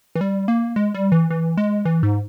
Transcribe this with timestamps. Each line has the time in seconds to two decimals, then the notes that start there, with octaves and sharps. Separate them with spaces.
0.15 E3
0.21 G3
0.48 A#3
0.76 G#3
0.94 G3
1.12 E3
1.30 E3
1.57 G#3
1.85 E3
2.03 G#2